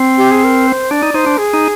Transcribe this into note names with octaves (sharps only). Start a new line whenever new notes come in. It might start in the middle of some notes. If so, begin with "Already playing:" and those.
Already playing: C4
G4
G#4
A#4
C5
D4 D5
D#4
D#4 C5
D4
G#4
D#4